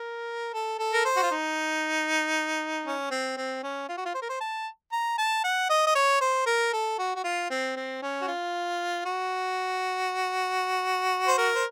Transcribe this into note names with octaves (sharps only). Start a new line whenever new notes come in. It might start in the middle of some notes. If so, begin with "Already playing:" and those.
Already playing: A#4
A4
A4
A#4
C5
F#4
F4
D#4
C#4
C4
C4
C#4
F4
F#4
F4
C5
A#4
C5
A5
A#5
A5
F#5
D#5
D#5
C#5
C5
A#4
A4
F#4
F#4
F4
C4
C4
C#4
F#4
F4
F#4
C5
A#4
C5